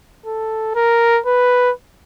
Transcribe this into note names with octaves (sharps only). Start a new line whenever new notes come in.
A4
A#4
B4